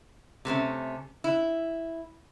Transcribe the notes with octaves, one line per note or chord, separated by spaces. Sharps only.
C3 A3 B3 C#4
E4